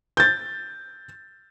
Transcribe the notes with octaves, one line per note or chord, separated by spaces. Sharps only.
G6 A6